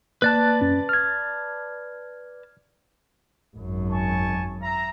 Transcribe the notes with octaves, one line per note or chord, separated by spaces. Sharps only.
A#3 B4 D5 A5 F#6
F#2 C#4
F6 G#6
G#1 F#2
G#5 A5 C#6
E5 A#5